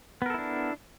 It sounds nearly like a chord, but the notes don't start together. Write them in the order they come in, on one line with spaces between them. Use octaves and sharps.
B3 A#4 A4 E4 D4